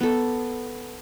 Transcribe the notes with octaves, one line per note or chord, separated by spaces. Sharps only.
B3 A4